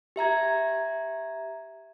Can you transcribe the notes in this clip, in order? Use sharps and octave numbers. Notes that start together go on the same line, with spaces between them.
G4 E5 A#5 G#6